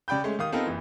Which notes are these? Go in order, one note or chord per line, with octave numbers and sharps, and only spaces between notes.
C#3 D5 G5 B5 G6
G#3 A3 C#4
D#3 F5 D#6
B3 C4 D#4 F4 A4 A#4
F#1 E3